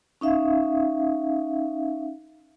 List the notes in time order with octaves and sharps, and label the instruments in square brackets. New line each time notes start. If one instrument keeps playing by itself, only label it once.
[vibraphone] C#4 D#4 E5 F5